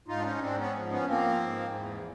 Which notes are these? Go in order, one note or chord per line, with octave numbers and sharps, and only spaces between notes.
G#2 D#4 F4
D4
C#4 D#4
G#2 C4 D4
B3 C#4
F3
B3 C#4
F3 A#3 C4
G#2
E2